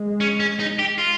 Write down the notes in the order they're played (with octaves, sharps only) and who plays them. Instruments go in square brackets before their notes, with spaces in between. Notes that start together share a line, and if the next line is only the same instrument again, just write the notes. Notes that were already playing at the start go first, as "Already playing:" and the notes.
Already playing: [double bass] G#3
[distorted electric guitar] C#4
C#4
D#4
G4
F4